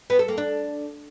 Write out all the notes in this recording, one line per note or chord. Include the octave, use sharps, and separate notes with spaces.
B3
A4
A#3
D4